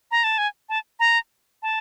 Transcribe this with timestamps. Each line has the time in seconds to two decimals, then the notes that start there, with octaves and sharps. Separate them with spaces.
0.11 A#5
0.24 A5
0.38 G#5
0.69 A5
1.00 A#5
1.63 A5